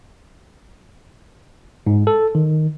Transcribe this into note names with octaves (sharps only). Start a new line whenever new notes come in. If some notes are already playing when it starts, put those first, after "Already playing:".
G#2
A4
D#3